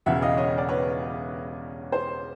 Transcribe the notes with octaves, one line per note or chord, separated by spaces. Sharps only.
E1 E2 C#3 E5 F#5
D#5 F5
C#5 D#5
D5
B4 C#5
C5